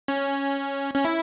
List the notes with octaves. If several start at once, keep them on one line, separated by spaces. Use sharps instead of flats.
C#4
C#4
E4